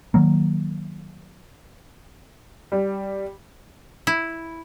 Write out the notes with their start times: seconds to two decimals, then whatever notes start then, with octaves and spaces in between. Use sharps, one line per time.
0.14 D#3 F#3 A#3
2.72 G3
4.07 E4